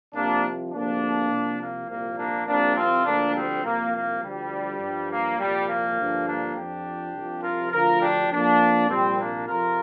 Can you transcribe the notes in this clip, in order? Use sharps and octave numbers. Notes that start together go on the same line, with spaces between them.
C2 C3 F3 A#3 D4
D2 C3 F3 A#3 D4
C2 C3 F3
A#3
C2 A#2 F3 A#3
A#3 D4
C2 C3 F3 A#3 D4
C4 F4
D2 D3 F3 A#3 D4
G3 C4
C2 C3 F3 A#3
A#3
D2 D3 F3 G3
G2 F3
A#3
C2 A#2 F3 G3
A#3
G2 D3 F3
A#3 D4
F2 F3 D4 G4
C2 C3 F3
F4 A#4
D2 D3 F3 F4 A#4
D4 G4
F2 F3 A#3 D4
C2 A#2 F3 G3 C4
A#3 D4
F2 C3 F3 F4 A#4